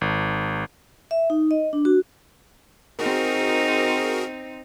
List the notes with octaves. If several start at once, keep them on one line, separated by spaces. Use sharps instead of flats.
G#1
E5
D#4
D#5
D4
F#4
C4 D#4 F#4 G#4 A#4